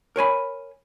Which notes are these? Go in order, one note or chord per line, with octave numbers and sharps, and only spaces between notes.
A#4 C#5 G#5 B5